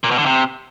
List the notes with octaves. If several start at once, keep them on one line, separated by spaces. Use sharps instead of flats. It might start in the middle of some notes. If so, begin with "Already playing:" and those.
A#2
B2
D3
C3